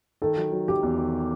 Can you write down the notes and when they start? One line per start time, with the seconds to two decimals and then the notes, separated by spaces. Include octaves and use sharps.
0.22 D#3 A4
0.37 F#3
0.52 F#3
0.68 F#3 G4
0.83 E2
0.98 D#3